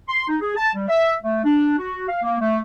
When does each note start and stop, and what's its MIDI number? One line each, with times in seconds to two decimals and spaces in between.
0.09 0.28 84
0.29 0.36 63
0.41 0.54 68
0.57 0.73 81
0.75 0.88 55
0.89 1.15 76
1.23 1.44 57
1.45 1.78 62
1.79 2.08 66
2.09 2.23 77
2.23 2.37 58
2.40 2.61 57